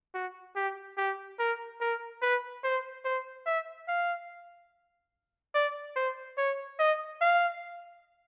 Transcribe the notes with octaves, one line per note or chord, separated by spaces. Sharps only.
F#4
G4
G4
A#4
A#4
B4
C5
C5
E5
F5
D5
C5
C#5
D#5
F5